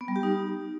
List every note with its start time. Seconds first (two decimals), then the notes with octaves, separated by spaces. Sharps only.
0.01 B3
0.08 G3
0.16 G4
0.23 D#4